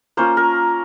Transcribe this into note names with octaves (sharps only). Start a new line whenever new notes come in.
A#3 C#4 F4 C5
A#4